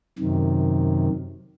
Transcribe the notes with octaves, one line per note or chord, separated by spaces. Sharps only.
F#2 C3 D#3